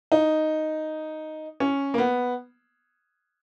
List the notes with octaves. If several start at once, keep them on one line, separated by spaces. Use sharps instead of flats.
D#4
C#4
A#3
B3